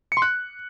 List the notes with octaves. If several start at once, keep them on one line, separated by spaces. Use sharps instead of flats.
C#7
C6
F#6